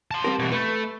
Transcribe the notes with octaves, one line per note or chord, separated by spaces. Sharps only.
A5 C6
G3 C4 A#4
B2 E3
A3 B4